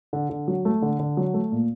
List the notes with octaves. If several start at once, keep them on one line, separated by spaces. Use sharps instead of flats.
D3
D3
F#3
A3
D3
D3
F#3
A3
A#2